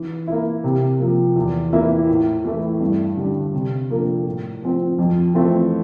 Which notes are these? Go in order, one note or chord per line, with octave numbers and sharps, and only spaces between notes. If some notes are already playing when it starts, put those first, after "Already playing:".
Already playing: E3
A#3 E4
C3
F3 A#3
E2
E3 A#3 E4
A2
E3 A3 E4
G2
D3 G3 D4
C3
F3 A#3 D4 A4
A2
F3 C4
F2
E3 A3 C4 F4